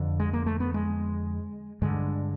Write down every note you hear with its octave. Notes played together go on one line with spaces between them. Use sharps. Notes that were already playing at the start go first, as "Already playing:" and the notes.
Already playing: F2 D3
G#3
A#3
A3
B3
G#3
G2 D3 G#3